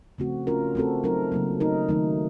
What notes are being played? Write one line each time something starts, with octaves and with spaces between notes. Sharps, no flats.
C#3 F3 A3 C4 F#4
A3 C#4 F4 A#4
A3 C4 F#4 A4
F#3 C4 D#4 A#4
C#3 F#3 A#3
A3 D#4 A#4
D#3 F#3 A3 D#4